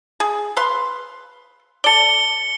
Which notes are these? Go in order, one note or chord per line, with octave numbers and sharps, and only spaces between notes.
G#4
B4 F5 C6
A4 D5 C#7 G7